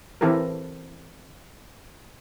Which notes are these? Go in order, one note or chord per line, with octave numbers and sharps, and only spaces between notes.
E3 C4 E4 G4 A4 A#4